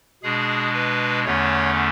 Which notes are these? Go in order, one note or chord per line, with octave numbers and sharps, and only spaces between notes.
B2 G#3 D4 G#4
B4
E2 D3 A3 C#4 C#5